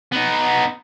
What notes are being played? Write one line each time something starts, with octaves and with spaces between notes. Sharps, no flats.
B3 D#4